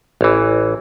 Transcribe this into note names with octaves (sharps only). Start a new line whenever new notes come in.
A1 E3